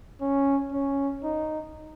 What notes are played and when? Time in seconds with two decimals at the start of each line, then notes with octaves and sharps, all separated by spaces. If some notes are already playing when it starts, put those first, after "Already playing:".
0.21 C#4
0.72 C#4
1.24 D#4